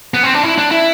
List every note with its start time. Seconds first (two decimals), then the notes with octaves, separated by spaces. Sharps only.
0.14 B3
0.23 C4
0.34 D4
0.43 E4
0.58 D4
0.71 E4